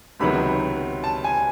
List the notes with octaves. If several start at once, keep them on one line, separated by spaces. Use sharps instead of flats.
C#2 C3 D#3 F#3 B3 B5
A5
G#5